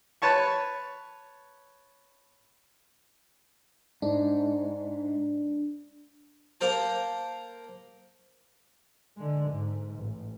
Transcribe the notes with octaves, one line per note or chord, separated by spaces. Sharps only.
B4 C#5 A5 C#6
G#2 D4
A#3 A4 A#4 C5 A5
D3 G#3
G#2
A1